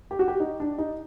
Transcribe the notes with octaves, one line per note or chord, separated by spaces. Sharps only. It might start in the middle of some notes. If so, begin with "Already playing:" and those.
G4
F#4
G4
D#4
D4
D#4